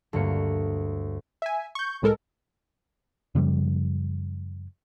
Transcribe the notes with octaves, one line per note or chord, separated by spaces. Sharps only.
D2 G2 A#3 C#5 C#7
E5 G#5
C#6 G6
C2 A2 G#3 A4 A#4
F#2 C#3 F3 G3